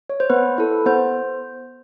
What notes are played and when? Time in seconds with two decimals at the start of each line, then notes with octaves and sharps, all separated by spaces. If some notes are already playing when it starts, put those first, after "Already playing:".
0.09 C#5
0.20 C5
0.30 B3 B4
0.58 E4 A4
0.86 B3 C5